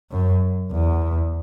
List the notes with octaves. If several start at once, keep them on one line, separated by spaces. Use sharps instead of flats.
F#2
E2